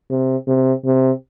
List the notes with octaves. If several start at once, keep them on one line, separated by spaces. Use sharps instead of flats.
C3
C3
C3